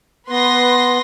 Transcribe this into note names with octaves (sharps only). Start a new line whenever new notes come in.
B3 B4 C6 A#6